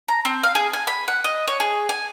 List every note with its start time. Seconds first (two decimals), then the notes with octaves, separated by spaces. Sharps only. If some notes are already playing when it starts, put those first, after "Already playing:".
0.08 A#5
0.25 C4
0.43 F5
0.55 G#4
0.73 G#5
0.87 B5
1.08 F#5
1.24 D#5
1.47 C#5
1.60 G#4
1.89 G#5